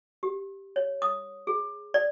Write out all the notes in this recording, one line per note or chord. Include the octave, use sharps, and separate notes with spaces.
G4
C#5
D#6
G#4
D5